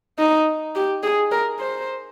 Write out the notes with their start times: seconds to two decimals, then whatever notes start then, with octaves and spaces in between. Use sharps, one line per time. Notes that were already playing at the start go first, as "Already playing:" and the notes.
0.19 D#4
0.76 G4
1.03 G#4
1.31 A#4
1.60 C5